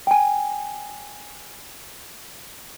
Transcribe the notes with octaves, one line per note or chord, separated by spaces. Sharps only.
G5 G#5